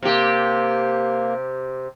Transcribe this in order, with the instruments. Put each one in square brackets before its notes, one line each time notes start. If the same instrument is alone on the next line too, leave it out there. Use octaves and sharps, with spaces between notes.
[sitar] C3 G4 [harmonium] A#3